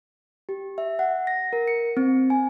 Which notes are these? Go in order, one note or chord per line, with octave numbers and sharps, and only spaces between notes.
G4
E5
F#5
A#6
A#4
C#7
C4
G#5